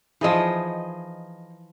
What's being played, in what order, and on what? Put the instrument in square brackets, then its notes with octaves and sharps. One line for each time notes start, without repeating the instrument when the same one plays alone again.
[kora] E3 F3 [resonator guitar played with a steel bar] D#4 G#4 D#5